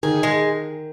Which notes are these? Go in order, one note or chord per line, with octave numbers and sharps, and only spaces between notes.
D#3 G#4
G#3